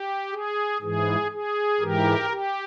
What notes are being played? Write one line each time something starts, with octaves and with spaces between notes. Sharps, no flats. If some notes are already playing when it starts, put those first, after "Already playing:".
Already playing: G4
G#4
G#2 E3 G#4
G#4
G#2 E3 G4 A#4
G4